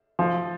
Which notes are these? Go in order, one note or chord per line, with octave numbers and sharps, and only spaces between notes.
F3